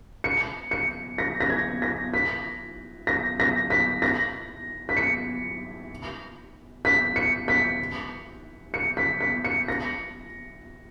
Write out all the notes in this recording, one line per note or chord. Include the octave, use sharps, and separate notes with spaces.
C#7
C#7
A#6
A#6
G#6
A#6
B6
A#6
A#6
B6
A#6
B6
C#7
B6
C#7
B6
C#7
B6
B6
C#7
A#6